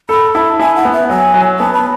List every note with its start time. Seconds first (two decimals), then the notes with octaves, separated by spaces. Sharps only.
0.09 A4 B5
0.35 E4 A5
0.59 E4 G#5
0.76 F#5
0.85 B3
0.93 E5
1.10 F#3 G#5
1.34 F#3
1.59 B3 A5
1.74 B5